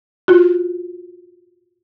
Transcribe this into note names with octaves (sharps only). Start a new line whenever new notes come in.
F4 F#4